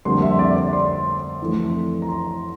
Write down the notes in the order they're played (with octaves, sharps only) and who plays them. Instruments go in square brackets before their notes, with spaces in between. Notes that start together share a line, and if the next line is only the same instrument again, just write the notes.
[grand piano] F2 D3 G3 A#3 C6
E5
D5
D5
C6
F2 E3 A3
A#5
C6